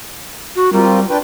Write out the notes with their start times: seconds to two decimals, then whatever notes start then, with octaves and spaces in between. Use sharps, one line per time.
0.56 F#4
0.73 G3 C4 F4 A#4
1.10 D4 B4 G5